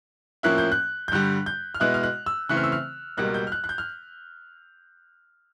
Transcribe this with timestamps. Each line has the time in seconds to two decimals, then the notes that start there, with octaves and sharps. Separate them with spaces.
0.43 A2 F3 A#3 C#4 E4 F#6
0.58 G6
0.72 F#6
1.08 G6
1.12 G2 D3 G3 F#6
1.46 G6
1.75 F6
1.80 B2 G#3 B3 E4 F#6
1.94 F6
2.03 F#6
2.26 E6
2.49 C#3 E3 A3 C4 F#6
2.57 F6
2.64 E6
2.72 F6
3.17 C#2 B2 G3 A#3 F#6
3.34 G6
3.47 F6
3.52 F#6
3.64 F#6
3.69 G6
3.78 F6